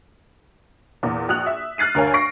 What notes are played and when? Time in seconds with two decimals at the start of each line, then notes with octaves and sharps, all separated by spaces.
1.03 E2 A#2
1.29 A#1 F#4 D#6 F#6 F7
1.46 E5
1.78 F6 F#6 A6 C7 D#7
1.95 D2 G2 A#4 C#5 F5 G#5
2.14 C#6 A#6 C7 D7